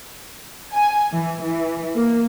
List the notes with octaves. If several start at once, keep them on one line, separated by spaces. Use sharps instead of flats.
G#5
E3
E3
A#3